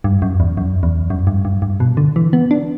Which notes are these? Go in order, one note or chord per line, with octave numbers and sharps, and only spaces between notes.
G2
F#2
E2
F#2
E2
F#2
G2
G2
G2
B2
D3
E3
B3
D4